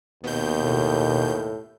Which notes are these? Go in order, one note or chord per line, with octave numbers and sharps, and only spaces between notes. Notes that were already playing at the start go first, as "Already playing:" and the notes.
D#2 B2 G6
A2